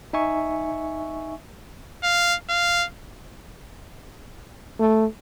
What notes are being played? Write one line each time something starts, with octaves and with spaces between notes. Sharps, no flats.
D#4 E5 G#5 C#6
F5
F5
A3